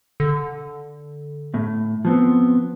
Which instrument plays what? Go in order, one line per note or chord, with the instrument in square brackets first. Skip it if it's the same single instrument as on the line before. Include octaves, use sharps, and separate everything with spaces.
[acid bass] D3
[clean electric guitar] A2
F3 B3 C4